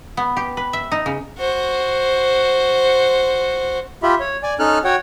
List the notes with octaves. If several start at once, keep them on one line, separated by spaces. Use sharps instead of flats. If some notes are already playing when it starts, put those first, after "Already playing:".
B3
G4
B4
E5
D#4
C#3
F#4 C5
F4 G4 E5 B5
C#5
D5 G#5
C#4 D#4 A4 F6 F#6
F#4 C#5 F#5 G5